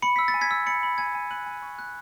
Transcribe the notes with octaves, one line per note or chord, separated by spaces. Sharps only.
B5 C#7
E6 B6
A6
G#5
G#6 B6
E6
B5 A6 C#7
B5
G#5 G#6
G#5
F#6 D#7 F#7
G#5
C#6
F#6